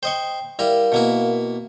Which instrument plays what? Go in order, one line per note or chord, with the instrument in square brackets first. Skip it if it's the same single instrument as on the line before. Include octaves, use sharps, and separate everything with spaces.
[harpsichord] C5 D#5 C#6 [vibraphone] G5
[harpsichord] G3 E4 [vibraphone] A#4 F5
[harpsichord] B2 A#3 E4